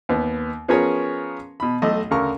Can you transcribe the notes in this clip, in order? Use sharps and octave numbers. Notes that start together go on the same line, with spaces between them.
D#2 B3
F3 B3 C#4 G#4 A#4 C#5
B2 B5
B1 A3 D#5
D2 C#3 A#4 C#6